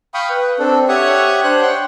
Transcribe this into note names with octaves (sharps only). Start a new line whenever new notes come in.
F5 G5 B5 C#6 D#6
B4
C4 D4 A4
G4 C#5 E5 F#5 C#6 D#6
D4 C5 F#6
F#5 G5 C6